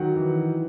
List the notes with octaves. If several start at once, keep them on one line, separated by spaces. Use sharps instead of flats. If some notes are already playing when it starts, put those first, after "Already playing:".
Already playing: D#3 F#3 F#4 F#5
E3